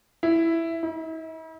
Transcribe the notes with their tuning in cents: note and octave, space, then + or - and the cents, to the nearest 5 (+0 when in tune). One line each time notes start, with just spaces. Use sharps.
E4 +5
E4 -45